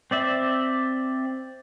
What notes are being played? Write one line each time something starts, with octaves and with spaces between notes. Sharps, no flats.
C4 D5 E5